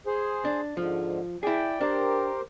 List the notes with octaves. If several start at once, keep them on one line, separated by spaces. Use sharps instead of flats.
G#4 C5
D4
G#2 D3 F3
E4 G#4 D5 G5
D4 G4 A#4 C5